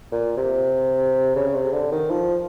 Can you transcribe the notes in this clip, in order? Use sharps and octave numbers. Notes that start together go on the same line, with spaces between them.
A#2
C3
C#3
C3
D3
D#3
F3